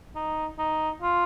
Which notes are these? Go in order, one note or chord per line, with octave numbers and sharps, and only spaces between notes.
D#4
D#4
F4